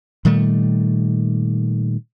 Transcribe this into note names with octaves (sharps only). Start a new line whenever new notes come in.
A#2 D#3 G3 A3